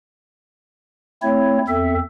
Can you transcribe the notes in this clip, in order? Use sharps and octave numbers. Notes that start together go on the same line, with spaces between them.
A3 C4 E4 C#5
E2 C4 A4 E5